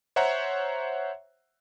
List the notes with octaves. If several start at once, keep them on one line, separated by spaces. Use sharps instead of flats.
C5 C#5 E5 F#5 A#5